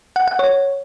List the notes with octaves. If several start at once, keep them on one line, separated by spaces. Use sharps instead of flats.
F#5
F#5
C#5